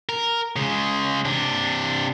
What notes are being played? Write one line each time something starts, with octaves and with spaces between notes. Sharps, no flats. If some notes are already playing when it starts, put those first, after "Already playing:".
A#4
C#3 G#3
C3 D4